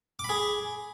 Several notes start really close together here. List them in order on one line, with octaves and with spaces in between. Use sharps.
D6 B5 G#4